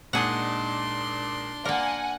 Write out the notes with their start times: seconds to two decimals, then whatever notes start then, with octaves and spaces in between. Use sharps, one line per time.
0.13 A#2 G#3 D4 D#4 G#4 F#5 C6
1.65 A#3 A#4 D5 F#5 G#5